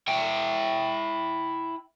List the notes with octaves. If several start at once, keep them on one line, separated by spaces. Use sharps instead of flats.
E4 G5